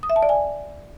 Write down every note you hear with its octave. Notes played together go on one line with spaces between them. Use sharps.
D#6
E5
A5
D5
G#5